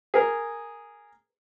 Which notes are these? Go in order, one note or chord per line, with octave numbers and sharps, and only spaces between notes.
G#4 A#4